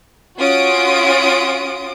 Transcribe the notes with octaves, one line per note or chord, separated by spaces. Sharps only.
C#4 F4 F#4 D#6 D7